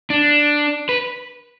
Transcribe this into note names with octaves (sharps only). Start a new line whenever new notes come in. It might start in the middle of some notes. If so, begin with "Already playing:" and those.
D4
B4